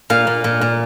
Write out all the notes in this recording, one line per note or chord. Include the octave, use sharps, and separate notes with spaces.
A#2 F5
A#2
A#2
A#2